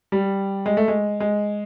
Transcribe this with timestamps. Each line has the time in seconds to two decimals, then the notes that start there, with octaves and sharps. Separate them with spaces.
0.12 G3
0.66 G#3
0.77 A3
0.88 G#3
1.20 G#3